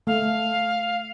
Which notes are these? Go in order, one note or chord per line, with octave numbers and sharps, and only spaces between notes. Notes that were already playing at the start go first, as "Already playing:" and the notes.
A3 F5